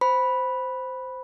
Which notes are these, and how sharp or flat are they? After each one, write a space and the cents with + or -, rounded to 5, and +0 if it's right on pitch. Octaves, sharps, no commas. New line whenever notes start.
C5 -10 B5 -5